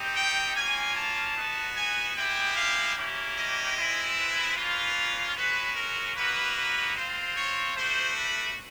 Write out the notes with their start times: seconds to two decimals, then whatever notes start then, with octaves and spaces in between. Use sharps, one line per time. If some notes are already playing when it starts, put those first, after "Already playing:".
Already playing: C4 D#4 G4
0.16 G5
0.56 A#3 C#4 F4 G#5
0.96 A5
1.37 B3 D#4 F#4
1.76 G#5
2.16 G#3 B3 E4 G4 G5
2.56 F5
2.96 A#3 C#4 E4 G4
3.36 D#5
3.76 G#3 C4 E4
4.16 B4
4.56 A#3 C#4 F4
5.36 G#3 C#4 F#4 B4
5.76 A#4
6.16 A#3 D#4 F#4 B4
6.56 B4
6.96 C4 F4 C5
7.36 C#5
7.76 A3 D4 F#4 C5
8.16 B4